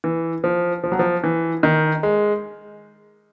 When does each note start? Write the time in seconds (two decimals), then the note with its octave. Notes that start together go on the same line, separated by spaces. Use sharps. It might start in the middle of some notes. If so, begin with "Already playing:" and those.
0.04 E3
0.44 F3
0.84 F3
0.92 F#3
0.99 F3
1.24 E3
1.63 D#3
2.03 G#3